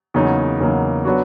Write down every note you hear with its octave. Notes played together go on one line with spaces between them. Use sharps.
E2 C#3 F#3 A#3 D#4
E2 C#3 F#3 A#3 D#4
F#3 B3 D4 F#4